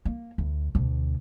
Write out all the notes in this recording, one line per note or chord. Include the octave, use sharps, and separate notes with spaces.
A#3
D2
D2 B2